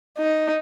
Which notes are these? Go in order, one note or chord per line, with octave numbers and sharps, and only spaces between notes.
D#4